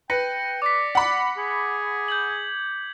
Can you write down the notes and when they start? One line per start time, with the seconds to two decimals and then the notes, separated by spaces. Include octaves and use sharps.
0.10 B4 G5 A#6 C#7
0.62 D5 D6 B6
0.95 F#5 B5
1.37 G#4
2.08 G6 G#6 F#7